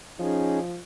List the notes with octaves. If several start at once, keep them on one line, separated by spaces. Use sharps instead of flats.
F3 C#4 D#4 G#4